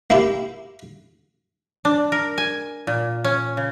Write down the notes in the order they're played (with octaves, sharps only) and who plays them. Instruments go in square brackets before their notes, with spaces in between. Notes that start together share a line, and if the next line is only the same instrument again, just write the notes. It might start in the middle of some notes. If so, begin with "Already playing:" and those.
[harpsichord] A#3 E4 G4
[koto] D4
A#4
G#5
A#2
C#4
C#3